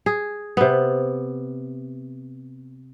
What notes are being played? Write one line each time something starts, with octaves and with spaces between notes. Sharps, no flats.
G#4
C3 B3